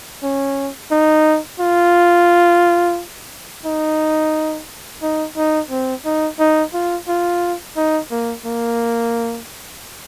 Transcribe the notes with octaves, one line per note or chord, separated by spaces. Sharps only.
C#4
D#4
F4
D#4
D#4
D#4
C4
D#4
D#4
F4
F4
D#4
A#3
A#3